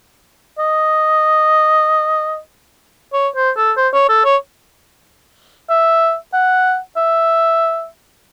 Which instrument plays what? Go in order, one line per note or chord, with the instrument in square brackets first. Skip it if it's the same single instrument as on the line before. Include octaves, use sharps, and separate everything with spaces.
[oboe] D#5
C#5
C5
A4
C5
C#5
A4
C#5
E5
F#5
E5